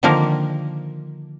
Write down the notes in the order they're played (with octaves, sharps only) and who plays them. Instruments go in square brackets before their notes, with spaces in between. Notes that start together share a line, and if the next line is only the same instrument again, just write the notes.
[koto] D3 D#3 F3 A#3 D4 A#4